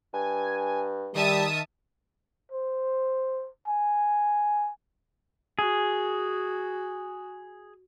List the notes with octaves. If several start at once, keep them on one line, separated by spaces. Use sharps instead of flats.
G2 G#5
D#3 G3 E5 A5 D#6
C5
G#5
F#4 G#4